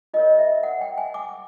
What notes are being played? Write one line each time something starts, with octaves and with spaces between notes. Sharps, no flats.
F4 A#4 C#5 D#5
E5
F#5
G5
G#5
D6